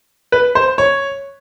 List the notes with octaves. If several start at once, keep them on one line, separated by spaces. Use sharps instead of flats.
B4
C5
C#5